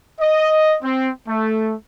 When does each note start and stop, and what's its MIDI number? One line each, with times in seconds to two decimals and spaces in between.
0.20 0.75 75
0.83 1.10 60
1.27 1.73 57